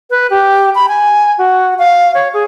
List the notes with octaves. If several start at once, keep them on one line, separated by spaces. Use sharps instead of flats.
B4
G4
B5
G#5
F#4
F5
C#5
G#4